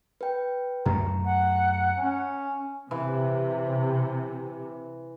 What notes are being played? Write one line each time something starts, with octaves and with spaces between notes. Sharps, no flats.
B4 G5
F#2 A3 A#5
F#5
C#4
C3 E3